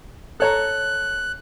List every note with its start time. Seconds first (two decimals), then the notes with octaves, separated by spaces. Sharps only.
0.40 A4 C#5 A#5 F#6